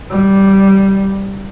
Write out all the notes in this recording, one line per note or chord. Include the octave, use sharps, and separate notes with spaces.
G3